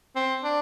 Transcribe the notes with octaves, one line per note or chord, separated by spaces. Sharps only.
C4
D4